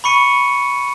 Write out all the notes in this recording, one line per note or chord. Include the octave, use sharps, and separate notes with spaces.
B5 C#6 C#7 D#7